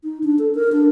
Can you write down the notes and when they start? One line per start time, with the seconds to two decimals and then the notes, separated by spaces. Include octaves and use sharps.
0.04 D#4
0.24 D4
0.39 A4
0.55 A#4
0.72 D4